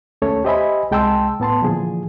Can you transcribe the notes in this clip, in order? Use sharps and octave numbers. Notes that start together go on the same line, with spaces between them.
D#2 A3 C#4 A4 C#5
G4 C5 D#5 E5 G#5 B5
C2 G#3 G5 A5 C6 E6
A2 B3 A5 C6
A#2 D3 E3 F3 G#4